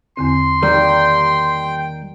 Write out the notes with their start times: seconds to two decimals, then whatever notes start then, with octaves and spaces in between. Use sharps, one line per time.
0.17 E2 D3 C4 C6
0.62 D#3 G3 A#3 G5